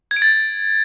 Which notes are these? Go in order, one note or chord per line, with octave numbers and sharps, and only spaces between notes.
G#6
D7
A6